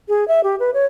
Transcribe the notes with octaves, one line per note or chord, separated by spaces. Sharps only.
G#4
E5
G4
B4
C#5